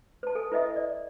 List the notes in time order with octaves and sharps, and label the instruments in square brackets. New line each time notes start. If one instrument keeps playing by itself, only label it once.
[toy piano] B4 A5
A4 G#5
E4 B4 D#5 E5 D#6
D5